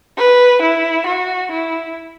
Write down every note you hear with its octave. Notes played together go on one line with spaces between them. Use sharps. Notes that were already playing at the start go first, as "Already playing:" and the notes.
B4
E4
F#4
E4